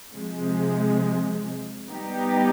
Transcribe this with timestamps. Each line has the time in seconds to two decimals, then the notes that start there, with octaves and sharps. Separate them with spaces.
0.15 C3 F3 G#3
1.89 G3 B3 D#4 G4